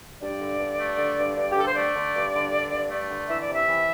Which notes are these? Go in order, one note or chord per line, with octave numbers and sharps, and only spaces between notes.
G2 D5
D3
G2
A3
D3
G2
G2
G4
D3 A4
C5
A3 D5
D3
G2
D3
D3
G2
A3
D3
E3 E5
D5
C3
E5
E3